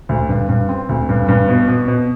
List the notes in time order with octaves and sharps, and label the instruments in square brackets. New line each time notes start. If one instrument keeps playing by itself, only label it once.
[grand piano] D2
G2
G2
C4
D2
G2
G2
B2
B2
B2